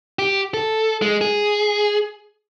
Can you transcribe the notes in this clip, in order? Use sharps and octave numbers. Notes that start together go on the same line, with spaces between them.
G4
A4
G#3
G#4